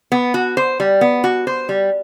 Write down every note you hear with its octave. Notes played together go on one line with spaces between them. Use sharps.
B3
F#4
C5
G3
B3
F#4
C5
G3